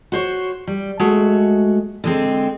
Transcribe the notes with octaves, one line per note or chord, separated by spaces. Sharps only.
F#4 C5 C#5
G3
G#3 A3 F#4
D3 G#3 C4